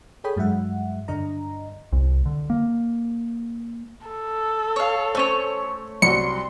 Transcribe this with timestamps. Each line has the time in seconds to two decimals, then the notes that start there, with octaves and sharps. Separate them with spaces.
0.24 G#4 A4 C#5 G5 B5 D#6
0.36 G2 F#3 G#3 E5 F#5
1.08 G2 D3 D4 D#5 A#5
1.92 C2
2.26 D3
2.50 A#3
4.07 A4
4.76 C#5 F5
5.15 A3 C#4 C5 C#5
6.02 C2 F#3 F#4 C6 C#7